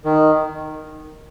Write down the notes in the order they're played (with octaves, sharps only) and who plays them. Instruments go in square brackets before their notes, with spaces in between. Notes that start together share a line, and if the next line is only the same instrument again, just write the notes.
[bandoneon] D#3